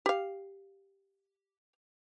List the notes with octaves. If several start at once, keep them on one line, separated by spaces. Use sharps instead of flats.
G4 F5